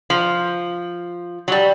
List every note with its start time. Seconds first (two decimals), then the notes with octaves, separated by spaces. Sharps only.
0.10 F3
1.48 F#3
1.52 G3